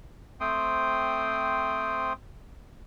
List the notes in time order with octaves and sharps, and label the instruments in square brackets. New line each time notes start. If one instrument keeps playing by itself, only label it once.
[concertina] A3 C4 C5 G5 C6 D#6